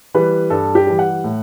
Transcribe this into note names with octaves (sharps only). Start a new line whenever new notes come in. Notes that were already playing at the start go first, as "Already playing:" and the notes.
E3 G3 B4
G2 A4
G4
E3 G3
F#5
A2